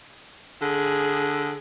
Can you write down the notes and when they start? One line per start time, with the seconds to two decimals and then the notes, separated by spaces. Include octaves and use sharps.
0.62 D3 G#4